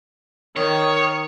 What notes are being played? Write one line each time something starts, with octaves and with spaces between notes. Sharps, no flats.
D#3 C#5